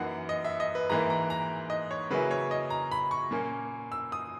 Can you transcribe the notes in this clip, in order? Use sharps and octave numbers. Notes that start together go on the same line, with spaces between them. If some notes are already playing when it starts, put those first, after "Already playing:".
Already playing: F#2 E3 A#3 D#4 F#5
D#5
E5
D#5
B4
G#2 E3 A#3 E4 A#5
A#5
A#5
D#5
C#5
C#3 F#3 A#3 C#4 E4 B4
C#5
D#5
A#5
B5
C#6
A#2 A#3 C#4
E6
D#6